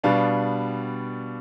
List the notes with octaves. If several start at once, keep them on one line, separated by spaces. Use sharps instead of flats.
B2 G3 B3 D4 F5